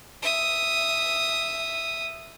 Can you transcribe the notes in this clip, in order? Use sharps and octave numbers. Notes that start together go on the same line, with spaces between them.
E5 D#6